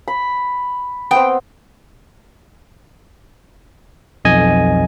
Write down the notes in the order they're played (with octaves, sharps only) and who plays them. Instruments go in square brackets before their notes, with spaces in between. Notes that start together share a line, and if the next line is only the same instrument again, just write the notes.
[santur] B5
[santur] B3 C4 [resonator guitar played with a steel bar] G5
[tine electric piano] B1 F2 D#5 G#5 G#6